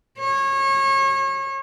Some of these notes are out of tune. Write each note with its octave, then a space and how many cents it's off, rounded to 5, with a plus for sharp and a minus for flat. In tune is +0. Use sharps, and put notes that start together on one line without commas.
C#5 -30